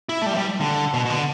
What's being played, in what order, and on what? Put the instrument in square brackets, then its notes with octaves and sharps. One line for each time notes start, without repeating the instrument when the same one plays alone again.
[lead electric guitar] E4
A3
G3
E3
G3
D3
B2
B2
D3